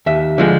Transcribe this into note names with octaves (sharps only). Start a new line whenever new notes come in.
D#2 E5
D3 F3 G#3